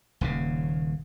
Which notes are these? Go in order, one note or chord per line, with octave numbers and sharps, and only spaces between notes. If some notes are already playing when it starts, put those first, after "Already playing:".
D#1 D#2 C#3